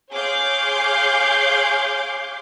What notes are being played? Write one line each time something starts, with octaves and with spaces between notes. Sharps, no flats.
G#4 C#5 F5 C6 D6 G6